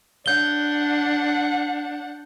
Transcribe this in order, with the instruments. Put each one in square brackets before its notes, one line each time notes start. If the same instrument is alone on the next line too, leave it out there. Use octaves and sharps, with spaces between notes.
[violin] D4 F#5 [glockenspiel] G6 G7